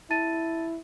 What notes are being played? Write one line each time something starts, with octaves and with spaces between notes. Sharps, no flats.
E4 A5 A6 D#7